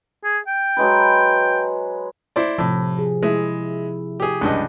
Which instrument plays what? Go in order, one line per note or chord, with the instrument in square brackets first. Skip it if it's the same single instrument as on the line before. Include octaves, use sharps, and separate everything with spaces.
[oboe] G#4
G5
[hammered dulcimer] F#3 G#3 B4
[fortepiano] E4 C5 D5
[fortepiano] A2 [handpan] C3 F3
[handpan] G#4
[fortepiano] G#3 E5 [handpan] E4
[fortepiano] G4 G#4
C#2 G2 D#5